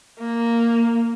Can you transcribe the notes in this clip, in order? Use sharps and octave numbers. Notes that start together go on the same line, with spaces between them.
A#3